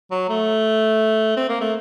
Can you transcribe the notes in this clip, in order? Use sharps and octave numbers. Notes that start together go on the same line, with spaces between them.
F#3
A3
C4
A#3
A3